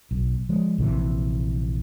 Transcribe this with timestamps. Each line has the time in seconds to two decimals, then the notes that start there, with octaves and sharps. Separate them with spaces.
0.11 B1
0.49 F3 G#3
0.78 A#1 C3 E3